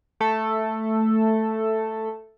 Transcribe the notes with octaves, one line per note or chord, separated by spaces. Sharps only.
A3 A4